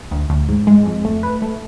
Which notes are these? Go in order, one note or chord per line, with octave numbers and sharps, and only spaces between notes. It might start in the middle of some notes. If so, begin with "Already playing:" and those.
D2
D2
G#2
G#3
F2
A3
B4
A3